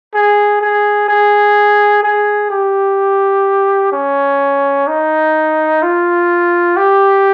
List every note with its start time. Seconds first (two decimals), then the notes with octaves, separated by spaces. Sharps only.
0.14 G#4
0.61 G#4
1.09 G#4
2.03 G#4
2.50 G4
3.92 C#4
4.87 D#4
5.82 F4
6.77 G4